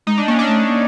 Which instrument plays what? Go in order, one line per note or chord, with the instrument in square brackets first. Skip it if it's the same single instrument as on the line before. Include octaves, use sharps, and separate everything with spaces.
[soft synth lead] G#3 [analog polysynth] D#4
[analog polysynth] D4
[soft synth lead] A#3 [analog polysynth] C#4
[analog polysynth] D4
[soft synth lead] A3
A#3